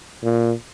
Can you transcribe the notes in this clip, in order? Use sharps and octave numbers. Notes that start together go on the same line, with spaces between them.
A#2